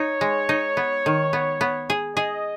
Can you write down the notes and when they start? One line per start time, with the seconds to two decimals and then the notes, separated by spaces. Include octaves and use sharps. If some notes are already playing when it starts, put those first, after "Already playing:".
Already playing: D#4 C#5
0.21 G#3
0.49 D#4
0.77 B3
1.06 D#3
1.33 B3
1.61 B3
1.90 G#4
2.17 G#4 D#5